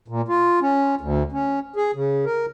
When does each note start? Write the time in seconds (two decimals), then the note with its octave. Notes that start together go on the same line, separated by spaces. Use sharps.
0.08 A#2
0.28 F4
0.62 C#4
1.01 D2
1.32 C#4
1.76 G#4
1.94 C#3
2.25 A#4